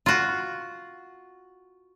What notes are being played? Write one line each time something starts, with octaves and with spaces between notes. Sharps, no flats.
F4 F#4